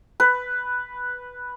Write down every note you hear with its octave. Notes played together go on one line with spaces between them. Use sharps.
B4